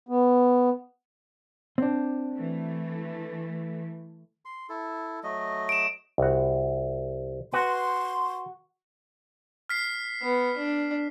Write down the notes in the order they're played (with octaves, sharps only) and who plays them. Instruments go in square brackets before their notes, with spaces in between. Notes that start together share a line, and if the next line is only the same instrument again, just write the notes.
[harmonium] B3
[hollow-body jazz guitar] C4 D4
[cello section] E3 A3
[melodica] C6
E4 A4
F#3 A3 D#5
[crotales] D7 E7
[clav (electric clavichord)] C2 F#4
[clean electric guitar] F#4 [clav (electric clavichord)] B4 [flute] C6
[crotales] F6 B6 C7
[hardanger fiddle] B3
D4